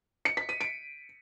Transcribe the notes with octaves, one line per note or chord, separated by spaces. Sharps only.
C#7
B6
D#7
D7